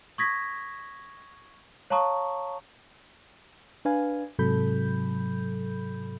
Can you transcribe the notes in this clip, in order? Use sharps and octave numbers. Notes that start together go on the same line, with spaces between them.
C#6 D#6 G#6 A#6 B6
C#5 F5 A5 A#5 C#6 D#6
D4 B4 F5 G#5
G#2 C3 F#3 A4 B5 G6